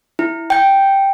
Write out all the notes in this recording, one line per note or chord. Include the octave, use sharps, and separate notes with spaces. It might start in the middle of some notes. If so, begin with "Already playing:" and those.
E4
G5 G6